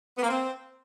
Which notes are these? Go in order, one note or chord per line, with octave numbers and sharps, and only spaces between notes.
B3
A#3
C4